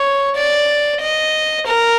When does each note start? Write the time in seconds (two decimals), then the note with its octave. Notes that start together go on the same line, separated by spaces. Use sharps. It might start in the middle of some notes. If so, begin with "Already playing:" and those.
Already playing: C#5
0.36 D5
1.01 D#5
1.66 A#4